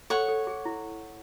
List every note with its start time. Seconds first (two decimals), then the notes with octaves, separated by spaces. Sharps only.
0.10 A4 C#5 F#5 C#6
0.28 A4
0.47 G#4
0.65 E4